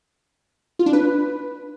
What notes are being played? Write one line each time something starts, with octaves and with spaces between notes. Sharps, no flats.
F4
D4
B4